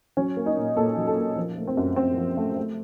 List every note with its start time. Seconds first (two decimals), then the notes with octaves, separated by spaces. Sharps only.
0.17 F#3 C#4
0.37 A#3
0.46 D#4
0.57 A#2
0.76 A#2 A4
0.97 F#3
1.07 A4
1.17 A#3
1.36 F3
1.57 A3
1.67 C4
1.77 F#2
1.96 F#2 C4
2.17 F3
2.37 A3
2.57 A3